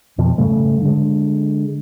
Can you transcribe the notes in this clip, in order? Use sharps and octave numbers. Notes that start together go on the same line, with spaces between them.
F2 B2 F3
G#2 C#3 G3 A3
D3 G#3